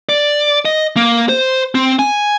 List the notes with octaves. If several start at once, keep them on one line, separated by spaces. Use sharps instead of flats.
D5
D#5
A#3
C5
C4
G#5